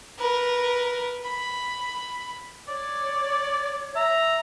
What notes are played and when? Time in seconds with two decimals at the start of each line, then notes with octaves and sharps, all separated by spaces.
0.18 A#4 B4
1.23 B5
2.68 C#5 D5
3.96 E5 A#5